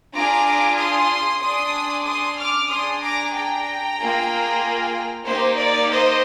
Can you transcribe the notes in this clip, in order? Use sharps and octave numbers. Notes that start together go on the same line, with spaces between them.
D4 F4 G#4 A#5 D6
C6 D#6
D4 G#4 C6 D#6
C6 D#6
D6 F6
D4 G#4 C6 D#6
A#5 D6
G5 A#5
A#3 F4 G#4
A#3 D#4 G4 C5
D5
C5 D#5